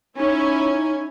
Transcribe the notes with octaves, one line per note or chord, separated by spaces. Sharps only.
C#4 D#4 E4 G#5